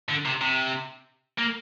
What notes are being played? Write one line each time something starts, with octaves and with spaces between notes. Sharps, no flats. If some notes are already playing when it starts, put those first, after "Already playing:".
D3
C3
C3
A#3